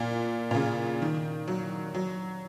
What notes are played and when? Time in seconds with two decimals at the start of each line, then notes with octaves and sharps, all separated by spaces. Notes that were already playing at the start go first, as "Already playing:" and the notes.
Already playing: A#2
0.51 A#2
0.55 C#3
1.02 D#3
1.48 F#3
1.95 F#3